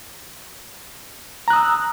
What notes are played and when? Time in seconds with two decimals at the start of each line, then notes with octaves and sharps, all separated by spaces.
1.48 A#5
1.50 F#6
1.53 D#6
1.56 E6